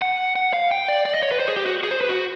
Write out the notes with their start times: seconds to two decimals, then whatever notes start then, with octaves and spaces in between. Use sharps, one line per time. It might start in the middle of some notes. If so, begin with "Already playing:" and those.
0.02 F#5
0.36 F#5
0.53 F5
0.71 G5
0.88 D5
1.05 D5
1.14 D#5
1.23 C#5
1.31 B4
1.40 C5
1.48 G#4
1.56 G4
1.66 F#4
1.83 G#4
1.91 C5
2.01 B4
2.09 F#4